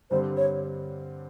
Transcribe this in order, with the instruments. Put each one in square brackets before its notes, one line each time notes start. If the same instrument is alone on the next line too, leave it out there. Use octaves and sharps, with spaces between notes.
[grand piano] G2 D3 G3 C4 [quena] C5
[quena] C#5